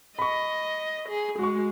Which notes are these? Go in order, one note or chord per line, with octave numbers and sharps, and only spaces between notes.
D#5 B5 C#6
G#4
G#3 F#4 C#6